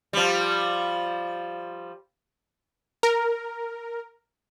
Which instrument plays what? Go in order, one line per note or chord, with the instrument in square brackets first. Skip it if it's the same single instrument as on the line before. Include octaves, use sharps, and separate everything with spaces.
[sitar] F3 G3
[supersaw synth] A#4